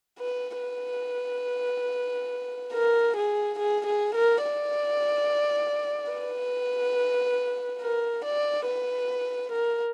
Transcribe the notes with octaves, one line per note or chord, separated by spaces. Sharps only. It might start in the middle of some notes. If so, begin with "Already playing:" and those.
B4
B4
A#4
G#4
G#4
G#4
A#4
D5
B4
A#4
D5
B4
A#4